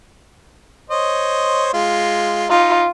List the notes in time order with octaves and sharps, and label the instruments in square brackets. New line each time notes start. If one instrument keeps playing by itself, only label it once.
[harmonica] C5 C#5 D#5
G#3 F4
[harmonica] D#4 [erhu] F4